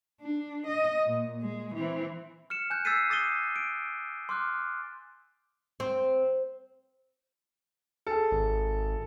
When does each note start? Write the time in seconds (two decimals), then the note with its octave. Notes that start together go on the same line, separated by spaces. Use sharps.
0.21 D4
0.68 D#5
1.06 A#2
1.42 G#3
1.75 E3 C4
2.50 F6 C#7 E7
2.70 G#5 F#6 G6
2.85 E6 G6 A6 B6 C7 D#7
3.10 D6 D#6 A6 C7 D#7 G7
3.56 D7
4.29 C6 D6 F6 F#6
5.80 C4
8.07 G#4 A4
8.31 G#1